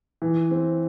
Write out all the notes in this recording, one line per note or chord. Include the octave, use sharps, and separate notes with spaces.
E3
C4